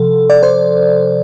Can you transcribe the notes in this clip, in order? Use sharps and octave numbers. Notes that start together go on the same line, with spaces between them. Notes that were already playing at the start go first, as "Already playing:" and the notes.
Already playing: C3 F3 A4
D5
C5